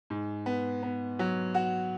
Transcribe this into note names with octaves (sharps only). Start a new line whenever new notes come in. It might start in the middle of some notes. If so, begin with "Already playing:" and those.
G#2
B3
B3
F#3
F#4